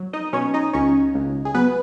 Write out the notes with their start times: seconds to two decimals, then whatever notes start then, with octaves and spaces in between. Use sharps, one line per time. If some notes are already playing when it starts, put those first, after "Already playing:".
Already playing: F#3
0.13 D#4 D#5
0.33 B2 C#4 C#5
0.54 D#4 D#5
0.73 C#2 C#4 C#5
1.14 C#2
1.45 G#4
1.54 F#3 B3 B4